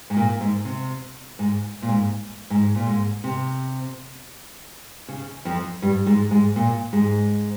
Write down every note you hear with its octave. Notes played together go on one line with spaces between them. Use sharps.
G#2
A#2
G#2
C3
G#2
A#2
G#2
G#2
A#2
G#2
C3
C#3
F2 F3
G2 G3
G#2 G#3
G#2 G#3
A#2 A#3
G#2 G#3